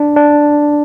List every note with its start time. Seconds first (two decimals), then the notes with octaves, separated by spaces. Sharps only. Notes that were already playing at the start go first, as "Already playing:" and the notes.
Already playing: D4
0.16 D4